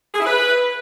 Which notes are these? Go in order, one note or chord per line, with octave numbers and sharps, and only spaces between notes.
G#4
E4
B4